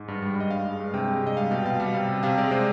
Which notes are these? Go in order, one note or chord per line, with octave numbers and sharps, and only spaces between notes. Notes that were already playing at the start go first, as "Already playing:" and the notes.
Already playing: G#2
G2
G3
G2 D#5
G2 F5
G#3
G2
C3 G5
G#3
C3 D#5
G3 F5
B2 G5
B2 F5
G3 F5
C3
C3
C3 F5
G#3 D5
C3 C5